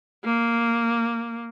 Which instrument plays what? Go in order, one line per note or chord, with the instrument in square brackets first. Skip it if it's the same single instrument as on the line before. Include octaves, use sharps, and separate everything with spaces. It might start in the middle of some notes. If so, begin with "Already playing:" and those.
[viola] A#3